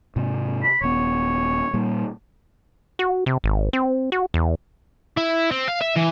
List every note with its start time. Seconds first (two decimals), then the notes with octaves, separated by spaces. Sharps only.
0.16 G#2 C3
0.63 B5
0.81 D#1 B3 C#5
1.74 A#2 G3 A#3
2.99 F#4
3.26 C3
3.44 G#1
3.73 C4
4.12 F#4
4.34 E2
5.17 E4
5.51 C4
5.68 F5
5.81 E5
5.96 E3